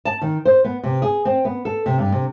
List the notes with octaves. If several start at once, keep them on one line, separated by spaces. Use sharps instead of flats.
A5
D#3
C5
B3
C3
G#4
C4
B3
A4
C3
G2
C3